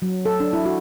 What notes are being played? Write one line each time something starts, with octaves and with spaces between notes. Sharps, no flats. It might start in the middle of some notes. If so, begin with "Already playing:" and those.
F#3
A4
D4
E4
F#4